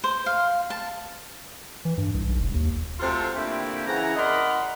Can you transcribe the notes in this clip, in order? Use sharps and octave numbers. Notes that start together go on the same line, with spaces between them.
C5
F5
A5
E3
G2
C2
B1
E1
D#2
C3 A3 F4 F#4 A4 C6
A#2 D3 A3 C4 E4 G4
C#3 E3 E4 F#5 A#5
A#4 D5 D#5 F#5 B5 C6